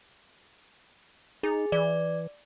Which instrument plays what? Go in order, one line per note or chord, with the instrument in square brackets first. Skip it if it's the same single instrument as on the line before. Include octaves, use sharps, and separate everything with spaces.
[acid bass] D#4 [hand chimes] G#4
[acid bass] E3 [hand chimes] D5